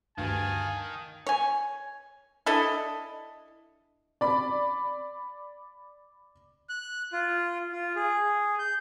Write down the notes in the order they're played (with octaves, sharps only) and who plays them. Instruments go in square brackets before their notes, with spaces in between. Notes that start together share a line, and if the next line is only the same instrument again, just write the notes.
[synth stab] D2 G2 [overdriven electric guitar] D#3 [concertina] F5 A5 [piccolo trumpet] G#5
[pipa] C#5 G#5
D4 E4 A4 D#5
[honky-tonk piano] D5 B5
[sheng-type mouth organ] F#6
F4
F4
G#4
G6